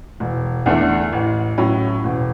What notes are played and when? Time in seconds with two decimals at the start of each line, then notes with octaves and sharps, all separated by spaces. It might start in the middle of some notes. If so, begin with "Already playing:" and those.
0.20 E1
0.66 E2 D3 A3 D4
1.13 A1
1.58 A2 F#3 C#4
2.04 E1